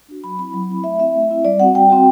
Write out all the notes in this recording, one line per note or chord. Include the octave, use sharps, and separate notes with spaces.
D4 F#4
F#3 B5
C4 E4 B5
F#3 B5
C4 E4
A3 E5
C4 E4 E5
A3
C4 E4
G3 D5
C4 F#4 F#5
G3 G5
C4 F#4